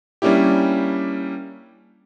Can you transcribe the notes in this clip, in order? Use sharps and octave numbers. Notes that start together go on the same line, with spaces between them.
G3 A#3 C#4 D4 E4 G4